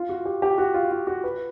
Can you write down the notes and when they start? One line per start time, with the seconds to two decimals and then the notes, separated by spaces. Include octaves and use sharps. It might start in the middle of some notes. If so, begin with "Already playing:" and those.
Already playing: F4
0.09 F#4
0.25 G4
0.42 G4
0.58 F#4
0.74 F4
0.91 F4
1.07 F#4
1.24 B4